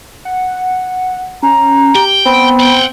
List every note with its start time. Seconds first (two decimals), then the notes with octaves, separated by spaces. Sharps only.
0.25 F#5
1.43 C#4 A#5
1.95 G4 G5
2.26 B3 C4 B5
2.60 F#5 G5